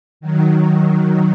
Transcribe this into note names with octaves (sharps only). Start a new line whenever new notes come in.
D#3 F#3
D#3 F#3